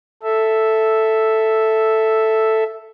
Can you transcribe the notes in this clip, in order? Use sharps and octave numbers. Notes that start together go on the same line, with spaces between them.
A4 E5